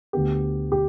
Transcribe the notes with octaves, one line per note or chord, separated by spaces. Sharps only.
D2 D3 B3 G4
G4